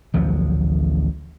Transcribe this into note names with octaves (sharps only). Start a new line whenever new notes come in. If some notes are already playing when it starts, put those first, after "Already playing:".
A1 D2 F3 F#3